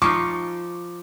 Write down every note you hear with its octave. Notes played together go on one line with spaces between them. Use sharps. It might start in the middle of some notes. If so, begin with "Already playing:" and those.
F3 D#4 F4 C#6 D6